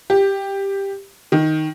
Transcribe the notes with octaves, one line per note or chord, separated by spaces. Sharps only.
G4
D#3